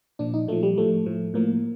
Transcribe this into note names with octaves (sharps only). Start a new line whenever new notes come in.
A#2 F3 D4
D#4
A#2 F3 A3
G3
A2 F3 A3
A2 F3
A2 F3 A#3